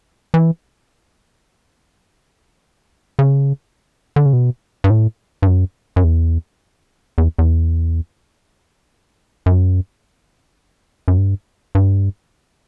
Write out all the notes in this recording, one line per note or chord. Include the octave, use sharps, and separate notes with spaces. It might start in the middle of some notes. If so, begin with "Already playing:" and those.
E3
C#3
D3
C#3
B2
G2
A2
G2
F#2
F#2
E2
E2
E2
F#2
F#2
G2
G2